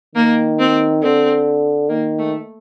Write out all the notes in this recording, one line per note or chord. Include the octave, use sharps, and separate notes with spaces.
D#3 A#3
C4
D3 C4
D#3 A#3
A3